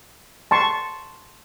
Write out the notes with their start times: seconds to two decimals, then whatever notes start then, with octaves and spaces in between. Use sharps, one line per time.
0.51 A5 C6 C#6